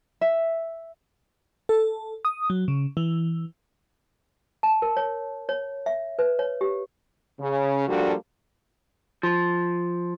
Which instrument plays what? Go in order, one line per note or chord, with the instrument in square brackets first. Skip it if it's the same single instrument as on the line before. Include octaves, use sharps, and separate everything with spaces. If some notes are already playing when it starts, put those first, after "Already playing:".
[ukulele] E5
[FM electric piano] A4
D#6
F#3
C#3
E3
[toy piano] A5
A#4
C#5
C#5
E5
B4
C#5
G4
[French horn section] C#3
F3 G3 A#3 D4 F#4 A4
[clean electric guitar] F3